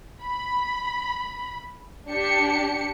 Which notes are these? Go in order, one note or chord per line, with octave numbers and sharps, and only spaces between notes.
B5
D4 G4 C#7